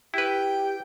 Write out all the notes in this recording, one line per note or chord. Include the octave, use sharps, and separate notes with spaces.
E4 G4 B4 G5